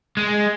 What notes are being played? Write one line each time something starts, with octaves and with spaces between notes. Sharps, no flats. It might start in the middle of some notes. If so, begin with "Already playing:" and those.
G#3